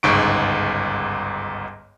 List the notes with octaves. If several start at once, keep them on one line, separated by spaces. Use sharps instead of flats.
G1 C#2 G#2 C#6 D7